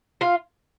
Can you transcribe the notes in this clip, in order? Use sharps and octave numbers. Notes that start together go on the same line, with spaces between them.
F4 F5